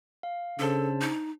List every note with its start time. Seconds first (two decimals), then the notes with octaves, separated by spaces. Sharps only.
0.23 F5
0.59 C#3 D4 A4 C5 A5
1.01 D#4